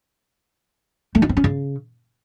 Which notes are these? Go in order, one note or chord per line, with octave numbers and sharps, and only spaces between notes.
A3
D#4
C4
C#4
C#3